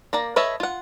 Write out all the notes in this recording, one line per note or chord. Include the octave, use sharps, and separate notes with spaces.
A#3 D5 A#5
A4 B4 C#5 D#5 E5
F4 F#5